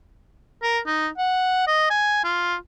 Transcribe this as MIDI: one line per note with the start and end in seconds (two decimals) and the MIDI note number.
0.63 0.79 70
0.86 1.08 63
1.18 1.64 78
1.67 1.88 75
1.90 2.23 80
2.24 2.55 65